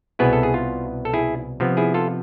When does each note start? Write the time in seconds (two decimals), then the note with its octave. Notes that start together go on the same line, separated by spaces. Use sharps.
0.19 C2 B2 B3 E4 G#4 B4
0.33 A4
0.43 G#4
0.54 F4
1.05 A4
1.14 E4 G#4
1.60 C3 F3 B3
1.77 E4 G#4
1.94 F4 A4